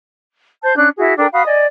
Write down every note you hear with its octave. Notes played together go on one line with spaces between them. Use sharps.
C5 A5 G6
C#4 D4 F#6
E4 F#4 G#4
D4 A4 A#4 G5
F#4 F5 B5 D#6
D5 D#5 G#5